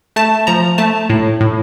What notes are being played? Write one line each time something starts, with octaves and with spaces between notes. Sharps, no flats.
A3 A5
F3 A#5
A3 A5
A2
A2